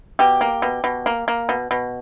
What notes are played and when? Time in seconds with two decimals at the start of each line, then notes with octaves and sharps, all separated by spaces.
0.19 B2 G4
0.41 A#3
0.62 B2
0.84 B2
1.06 A#3
1.28 A#3
1.49 B2
1.71 B2